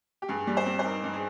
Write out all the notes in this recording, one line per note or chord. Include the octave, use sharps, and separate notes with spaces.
G4
G2 G#4
G3
C5
C4
C5
D#4 A#4
G2
G#4